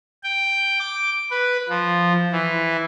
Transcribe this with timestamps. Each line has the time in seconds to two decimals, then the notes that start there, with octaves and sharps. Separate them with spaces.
0.23 G5
0.80 D6
1.30 B4
1.69 F3
2.32 E3